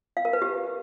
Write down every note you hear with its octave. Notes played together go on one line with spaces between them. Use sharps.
F5
A#4
B4
G4